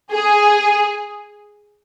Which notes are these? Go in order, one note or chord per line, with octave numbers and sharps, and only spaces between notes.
G#4